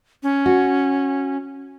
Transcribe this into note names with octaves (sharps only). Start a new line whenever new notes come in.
C#4
F#4